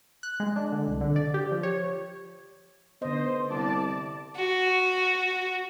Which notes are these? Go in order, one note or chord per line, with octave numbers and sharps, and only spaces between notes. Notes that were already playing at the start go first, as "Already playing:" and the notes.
F#6
G#3
D4
D3
C2
D3
D5
G4
F3
C#5
D3 B3 C5 D#5
C2 D5 A5
F#4